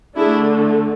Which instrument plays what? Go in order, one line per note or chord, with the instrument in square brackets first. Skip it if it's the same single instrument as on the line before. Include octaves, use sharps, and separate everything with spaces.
[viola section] D3 A3 D4 E4 G#4